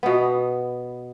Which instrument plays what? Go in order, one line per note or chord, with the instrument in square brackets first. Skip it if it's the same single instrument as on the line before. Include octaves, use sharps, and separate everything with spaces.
[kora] B2 B3